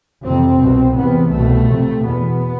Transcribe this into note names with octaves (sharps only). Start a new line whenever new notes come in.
F2 C3 C4
C2 B2
E2 C3 B3
C2 B2 A3
F2 C3
E2 B2 B3